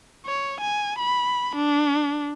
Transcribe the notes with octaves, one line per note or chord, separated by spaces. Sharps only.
C#5
G#5
B5
D4